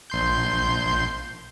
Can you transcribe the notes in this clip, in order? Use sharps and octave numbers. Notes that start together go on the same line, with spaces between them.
A#1 C6 G6